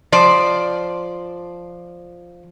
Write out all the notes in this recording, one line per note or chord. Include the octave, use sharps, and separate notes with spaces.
F3 C5 D5